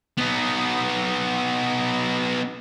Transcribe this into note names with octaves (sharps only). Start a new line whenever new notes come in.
B3 D#4